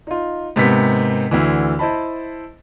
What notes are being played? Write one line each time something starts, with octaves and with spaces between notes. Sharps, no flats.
D#4 F4
G#2 C3 A#3 B3 B6
D2 D3 E3
E4 C5 D#5 A5 B5